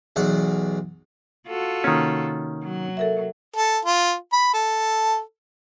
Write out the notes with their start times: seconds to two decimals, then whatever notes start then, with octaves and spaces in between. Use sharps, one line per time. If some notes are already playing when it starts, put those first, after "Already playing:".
0.16 B1 E2 F#5
1.47 F4 F#4 A4
1.84 C3 D#3 A#3 C#4
2.63 F#3
2.97 A4 A#4 E5
3.56 A4
3.85 F4
4.33 B5
4.54 A4